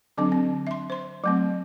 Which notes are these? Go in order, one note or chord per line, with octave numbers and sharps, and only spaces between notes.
D3 F#3 C4 D4
C4
E5 C6
C5 C6
F#3 A3 C4